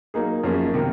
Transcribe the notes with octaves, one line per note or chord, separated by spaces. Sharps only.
F#3 A#3 D#4 G#4
F#2 F3 A#3 C#4 G#4
C3 D#3 A#3